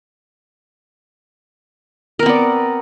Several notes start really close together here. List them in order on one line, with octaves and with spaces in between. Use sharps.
A#4 C4 B3 D5